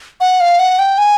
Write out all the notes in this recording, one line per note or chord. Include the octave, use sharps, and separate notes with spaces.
F#5
F5
F#5
G5
G#5